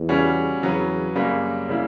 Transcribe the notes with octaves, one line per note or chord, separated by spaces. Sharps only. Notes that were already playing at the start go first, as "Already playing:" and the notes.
Already playing: E2
C#3 G3 C#4 F#4
E2 C#3 F#3 B3
F#2 C#3 G3 A#3
C#3 G3 A#3 E4